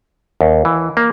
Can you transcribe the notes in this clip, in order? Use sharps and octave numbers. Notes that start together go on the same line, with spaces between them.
D#2
E3
A#3